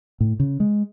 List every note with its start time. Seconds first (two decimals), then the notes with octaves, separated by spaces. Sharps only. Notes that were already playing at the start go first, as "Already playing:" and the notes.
0.20 A2
0.40 C#3
0.60 G#3